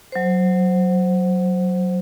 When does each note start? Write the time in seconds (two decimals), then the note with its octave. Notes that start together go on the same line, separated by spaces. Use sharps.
0.12 F#3 C5